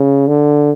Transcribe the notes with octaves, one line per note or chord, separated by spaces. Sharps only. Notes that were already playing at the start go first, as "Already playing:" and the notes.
Already playing: C#3
D3